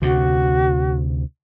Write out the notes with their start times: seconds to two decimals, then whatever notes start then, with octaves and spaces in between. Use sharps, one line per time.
0.02 D2 C3 F#4